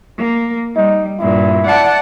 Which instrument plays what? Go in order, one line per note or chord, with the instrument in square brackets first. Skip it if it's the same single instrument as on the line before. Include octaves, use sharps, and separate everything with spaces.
[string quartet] A#3
[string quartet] G3 [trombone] D#4
[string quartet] G2 A#2 [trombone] E4
[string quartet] D5 F#5 A5